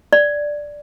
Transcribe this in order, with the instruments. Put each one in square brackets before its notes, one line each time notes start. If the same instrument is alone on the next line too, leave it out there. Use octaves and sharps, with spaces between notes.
[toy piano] D5